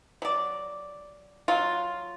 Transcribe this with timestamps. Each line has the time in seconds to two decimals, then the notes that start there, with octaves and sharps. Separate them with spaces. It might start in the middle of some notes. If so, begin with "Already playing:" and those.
0.22 F#3 D5
1.48 F#3 F4